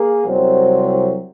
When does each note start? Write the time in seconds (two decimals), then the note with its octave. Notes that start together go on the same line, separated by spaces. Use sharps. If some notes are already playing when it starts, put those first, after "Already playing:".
Already playing: A#3 G#4
0.26 C2 C3 F#3 C4